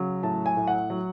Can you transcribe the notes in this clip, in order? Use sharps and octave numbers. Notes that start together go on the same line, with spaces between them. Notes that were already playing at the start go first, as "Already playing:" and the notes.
Already playing: C#3 F#3
A2 A5
G#5
A2
F#5
F#3